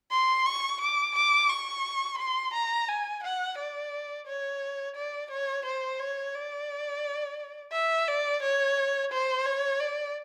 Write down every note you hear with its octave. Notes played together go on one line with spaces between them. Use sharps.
C6
C#6
D6
D6
C#6
C6
A#5
G#5
F#5
D5
C#5
D5
C#5
C5
C#5
D5
E5
D5
C#5
C5
C#5
D5